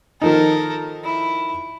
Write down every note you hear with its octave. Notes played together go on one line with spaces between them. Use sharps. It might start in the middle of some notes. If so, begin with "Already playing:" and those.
D#3 F3 D#4 A4 A#4
E4